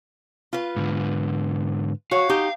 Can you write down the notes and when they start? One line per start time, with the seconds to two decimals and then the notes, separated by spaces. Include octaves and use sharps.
0.53 F4 B4
0.76 G#2 D3
2.11 F#4 C#5 F5
2.29 D#4 G4